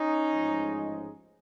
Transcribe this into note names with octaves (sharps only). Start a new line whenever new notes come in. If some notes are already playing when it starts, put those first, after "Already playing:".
Already playing: C#4 D#4
A1 G#2 F3 G#3